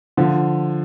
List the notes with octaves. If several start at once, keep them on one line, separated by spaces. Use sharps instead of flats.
D3 F3